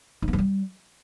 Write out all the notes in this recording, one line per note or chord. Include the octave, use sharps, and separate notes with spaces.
D#4
B3
F3
G3